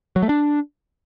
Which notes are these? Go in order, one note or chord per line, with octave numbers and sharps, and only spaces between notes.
F#3
A3
D4